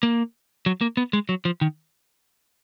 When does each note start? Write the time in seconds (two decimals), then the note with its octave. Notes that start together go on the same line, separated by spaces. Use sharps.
0.03 A#3
0.66 F#3
0.81 A#3
0.97 B3
1.13 G#3
1.29 F#3
1.45 F3
1.61 D#3